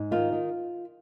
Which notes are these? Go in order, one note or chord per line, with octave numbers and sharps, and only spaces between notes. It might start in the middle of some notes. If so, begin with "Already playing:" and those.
Already playing: G#2
D#3 F4
D#3